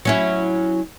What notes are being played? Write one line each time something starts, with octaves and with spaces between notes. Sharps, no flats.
F#3 C#4 E4